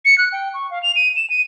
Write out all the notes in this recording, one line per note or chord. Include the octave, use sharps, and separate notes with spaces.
C#7
F#6
G5
C#6
F5
F7
D#7
E7
D#7